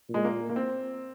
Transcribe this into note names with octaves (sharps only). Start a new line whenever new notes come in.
A#2
G#3
A#3
A#3
C4